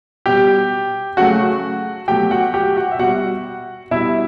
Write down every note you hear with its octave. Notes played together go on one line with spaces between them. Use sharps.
B2 G3 G4 G5
C#3 F#3 A3 F#4 F#5
B2 F#3 A3 G4 G5
F#4 F#5
G4 G5
F#4 F#5
E5
B2 G3 F#4 F#5
B2 G3 E4 E5